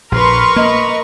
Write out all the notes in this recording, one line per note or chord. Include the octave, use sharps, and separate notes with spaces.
A#1 A#4 B4 C6 C#6 F6
A#3 D#5